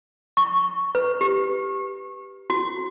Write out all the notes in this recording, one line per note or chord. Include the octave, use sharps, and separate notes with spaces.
C#6
B4
G4
F#4